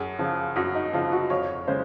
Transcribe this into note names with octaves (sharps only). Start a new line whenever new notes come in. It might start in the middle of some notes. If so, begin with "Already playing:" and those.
Already playing: F#2 G#4
C#3 F3
F#2 F#4
D#4
C#3 F3 F4
F#4
F2 C#5
C#3 G#3 C#4 C5